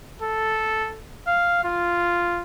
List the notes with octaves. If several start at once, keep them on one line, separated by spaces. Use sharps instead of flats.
A4
F5
F4